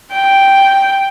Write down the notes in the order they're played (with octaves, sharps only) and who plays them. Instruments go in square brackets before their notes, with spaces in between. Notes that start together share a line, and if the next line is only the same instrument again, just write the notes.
[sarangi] G5